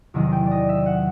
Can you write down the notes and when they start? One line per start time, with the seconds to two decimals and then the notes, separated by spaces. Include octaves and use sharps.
0.14 E2 C3 D#3 F#3 D#5
0.32 G5
0.46 D5
0.51 D#5
0.69 E5
0.86 F#5